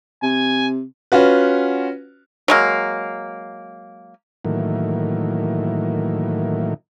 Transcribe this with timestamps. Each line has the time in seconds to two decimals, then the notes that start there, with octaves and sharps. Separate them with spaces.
0.23 C3 G#5
1.12 C#4 F4 F#4 B4
2.48 F#3 G#3 A#3
4.45 A2 D#3 E3 F#3 A#3